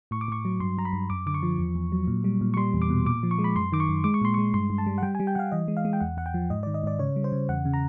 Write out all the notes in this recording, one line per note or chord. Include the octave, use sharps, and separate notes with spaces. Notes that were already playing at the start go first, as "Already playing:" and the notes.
A2 C#6
D6
A2 C#6
F#3
G2 C6
G2 A#5
B5
G2
F#2 D6
D3 D6
C#6
F3
E2
E2
F#3
A#2
G3
A#2
C#6
G3 C6
E2
D6
B2
A#2 D6
F3
C#6
G#3
B5
F#2 C6
D#3 D6
C#6
F#2
G#3 D6
C#6
A#2 C6
G#3 C#6
G2 C6
G2
A5
G3
F#5
G3 G5
G#5
G3
G5
G3 F5 F#5
E3 D#5
G#3
F5
G#3
G5
E2 F#5
E2 F#5
G5
F3
G#2 D#5
D#3 D5
D#5
G#2 D5
C#3 C#5
G3
C5
C#3
E2 F#5
C#3
A#5